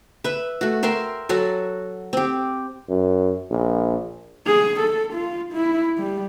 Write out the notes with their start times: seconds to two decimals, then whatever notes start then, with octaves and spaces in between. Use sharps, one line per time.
0.24 B4 E5
0.61 A3 F#4
0.83 A#4 E5 G5 C6
1.29 F#3 F#4 A4
2.13 C4 G4
2.89 F#2
3.50 A#1
4.46 G#4
4.80 A4
5.13 F4
5.53 E4
5.98 G3